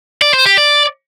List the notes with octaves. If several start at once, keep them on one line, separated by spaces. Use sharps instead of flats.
D5
C5
G4
D5